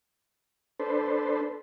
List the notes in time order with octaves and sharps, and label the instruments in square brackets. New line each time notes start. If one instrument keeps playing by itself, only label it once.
[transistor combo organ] D4 A4 B4 C5